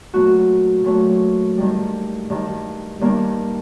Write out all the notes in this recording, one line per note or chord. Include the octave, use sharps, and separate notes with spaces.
A#2 F#3 A3 F#4
A#2 F#3 A3
G2 D#3 G3
G2 D#3 G3
G2 D#3 G3 A#3